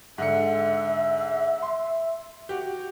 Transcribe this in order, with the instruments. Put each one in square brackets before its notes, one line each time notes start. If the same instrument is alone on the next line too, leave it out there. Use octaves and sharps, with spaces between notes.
[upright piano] G#2 D3 C#7 [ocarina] E5
[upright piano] C6
F#4 G4